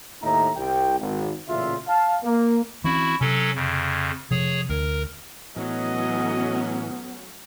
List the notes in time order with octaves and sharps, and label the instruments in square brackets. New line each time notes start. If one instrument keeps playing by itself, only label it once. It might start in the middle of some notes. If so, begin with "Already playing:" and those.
[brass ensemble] D#2 A2 D#4 E5 A#5
C2 G5
G#1
A1 A#2 C#3 F4 E5
F5 A5
A#3
[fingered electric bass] E3 C4 C#4 [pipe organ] E4 F#4
[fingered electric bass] C3 [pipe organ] F#3 C#4 A4
[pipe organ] F2 C#3
[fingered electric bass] C3 F3 [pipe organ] G#4 C#5
[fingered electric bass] D2 [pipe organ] A#4
[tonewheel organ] A2 E3 [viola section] F#3 A3 C#4 [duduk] B3 [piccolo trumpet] D#5